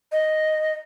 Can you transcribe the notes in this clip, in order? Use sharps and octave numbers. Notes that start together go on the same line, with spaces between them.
D#5